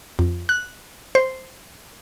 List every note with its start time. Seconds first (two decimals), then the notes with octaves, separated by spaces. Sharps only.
0.19 F2
0.49 F#6
1.15 C5